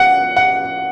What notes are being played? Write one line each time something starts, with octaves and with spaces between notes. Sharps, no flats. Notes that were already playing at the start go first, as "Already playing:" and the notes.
Already playing: F#5
F#5